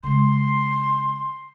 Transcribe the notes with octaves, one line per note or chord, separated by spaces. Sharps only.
C#3 G#3 C6